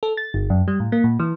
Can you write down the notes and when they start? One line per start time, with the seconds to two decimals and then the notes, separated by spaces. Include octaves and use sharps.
0.03 A4
0.17 A6
0.34 G1
0.50 F#2
0.68 G3
0.80 A2
0.92 A#3
1.04 A#2
1.19 E3